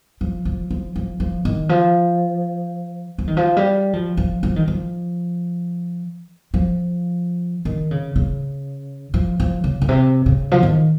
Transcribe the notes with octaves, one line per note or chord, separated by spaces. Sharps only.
F3
F3
F3
F3
F3
D#3
F3
F3
D#3
F3
G3
F3
F3
F3
D#3
F3
F3
D#3
C#3
C#3
F3
F3
C#3
A#2
C3
C#3
F3
D#3